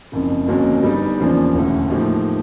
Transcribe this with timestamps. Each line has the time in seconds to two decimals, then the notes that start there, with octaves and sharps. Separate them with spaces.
0.12 F#1 F2 C#3
0.47 G1 F2 C#3 F#3 A#3
0.83 D3 G3 B3 D#4
1.19 E2 C#3 F3 A#3 D4
1.54 E1 D2 C#3
1.90 A2 F3 A#3 D#4 G4